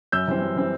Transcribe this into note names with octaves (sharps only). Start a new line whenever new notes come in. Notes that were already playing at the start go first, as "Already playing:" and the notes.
F#2 E6 G6
E3 G3 C4
F#2
E3 G3 C4